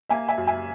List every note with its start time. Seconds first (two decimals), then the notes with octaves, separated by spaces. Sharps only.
0.09 A#3 E5 G#5
0.29 E5 G#5
0.38 F#2
0.47 E5 G#5